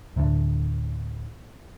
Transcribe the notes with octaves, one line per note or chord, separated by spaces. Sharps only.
D1 D2 A2 D3